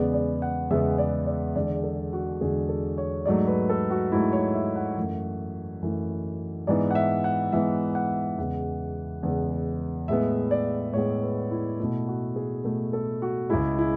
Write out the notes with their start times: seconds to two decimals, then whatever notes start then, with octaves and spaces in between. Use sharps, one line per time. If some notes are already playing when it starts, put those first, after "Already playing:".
Already playing: E2 C#3 G#3 B3 D5
0.14 D5
0.42 F#5
0.71 E2 C#3 G#3 B3 E5
0.98 D5
1.26 D5
1.56 E2 D3 G#3 D5
1.83 A4
2.13 F#4
2.41 E2 D3 G#3 G#4
2.69 A4
2.98 C#5
3.25 G#2 F#3 A3 D5
3.47 B4
3.69 A4
3.90 F#4
4.12 G#2 F#3 A3 E4
4.33 C#5
4.54 E5
4.76 F#5
4.97 F#2 E3 A3
5.82 F#2 E3 A3
6.67 G#2 E3 B3 D5
6.91 F#5
6.95 E5
7.24 F#5
7.52 G#2 E3 B3 E5
7.95 F#5
8.37 E2 C#3 G#3 B3 F#5
9.23 E2 C#3 G#3 B3
10.08 A2 G#3 B3 E5
10.51 D5
10.93 A2 G#3 B3 C#5
11.23 B4
11.51 E4
11.80 B2 A3 E4
12.08 F#4
12.36 G#4
12.64 B2 A3 A4
12.93 A4
13.22 F#4
13.50 C#2 C#3 G#3 E4
13.78 E4